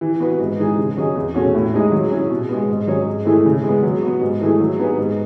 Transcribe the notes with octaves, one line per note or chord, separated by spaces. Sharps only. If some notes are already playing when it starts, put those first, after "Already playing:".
E3
B3 F#4 B4
G#2
E3 G#3 D#4 G#4
C#3
F#3 C#4 G#4 D#5
E2
B2 A3 C#4 F#4
A2
G#3 D#4 G#4 D#5
F#3
C#4 E4 G#4
B2
G#3 B3
G#2
F#3 C#4 G#4 C#5
G#2
E3 A3 E4 G#4
C#3
G#3
B3
F#3
B3 F#4
G#2
E3 A3 E4 G#4
F#3
B3 D#4 G#4 B4
G#2